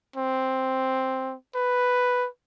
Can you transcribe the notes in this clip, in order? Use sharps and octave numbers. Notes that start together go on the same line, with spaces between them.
C4
B4